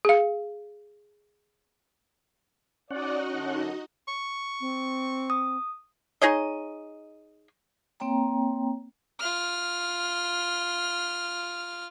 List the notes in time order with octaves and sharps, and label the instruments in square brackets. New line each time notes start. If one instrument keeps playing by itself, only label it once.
[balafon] G#4 F5
[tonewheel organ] C#4 F#5 [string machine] D#4 F#4 D#5 [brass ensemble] D5
[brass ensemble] F#2 D3
[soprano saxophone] C#6
[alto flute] C4
[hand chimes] D#6
[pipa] D#4 G#4 C#5 D#5
[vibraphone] A#3 C4 C#5 G5 A#5
[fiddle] F4 F6